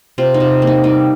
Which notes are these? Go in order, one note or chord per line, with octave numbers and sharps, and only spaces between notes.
C3 F4
D#4
C3
A#3
D#4
G3 D#4